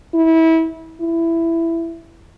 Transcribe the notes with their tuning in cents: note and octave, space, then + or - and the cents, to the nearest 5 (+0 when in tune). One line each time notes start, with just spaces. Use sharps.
E4 -25
E4 +10